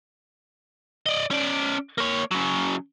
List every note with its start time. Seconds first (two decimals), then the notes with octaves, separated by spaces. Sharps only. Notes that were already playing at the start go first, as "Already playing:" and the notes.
1.06 D5 D#5
1.31 C#4 D5
1.98 A#3 C#5
2.31 C#3 F#3